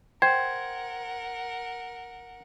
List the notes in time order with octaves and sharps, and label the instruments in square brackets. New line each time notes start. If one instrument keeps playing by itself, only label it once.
[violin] A#4 F#5 [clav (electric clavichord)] C5 [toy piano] G5 [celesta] G#6